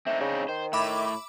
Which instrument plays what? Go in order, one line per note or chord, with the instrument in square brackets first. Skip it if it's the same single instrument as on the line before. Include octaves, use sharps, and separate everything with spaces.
[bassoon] A3 [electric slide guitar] C4 D4 D#4
[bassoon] C#3
[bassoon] D#3 [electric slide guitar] C5
[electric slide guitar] A2 [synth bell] E5 B5 D6